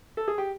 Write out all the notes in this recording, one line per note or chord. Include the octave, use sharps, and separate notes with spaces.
A4
G#4
G4